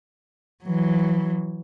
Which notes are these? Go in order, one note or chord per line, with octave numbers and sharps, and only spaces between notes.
E3 F#3